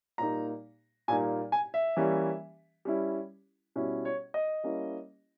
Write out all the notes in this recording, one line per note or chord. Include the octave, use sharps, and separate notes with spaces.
A#2 G3 A#3 D#4 A#5
A#2 G3 A#3 D#4 G#5
G#5
E5
E3 G3 A#3 C#4
G3 C#4 E4
B2 G3 C#4 E4
C#5
D#5
G3 A#3 C#4 E4